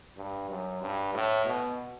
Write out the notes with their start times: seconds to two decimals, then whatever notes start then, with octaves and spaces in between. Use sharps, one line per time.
0.17 G2
0.50 F#2
0.82 G2
1.14 A2
1.46 B2